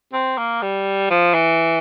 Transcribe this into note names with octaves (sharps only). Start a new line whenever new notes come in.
C4
A#3
G3
F3
E3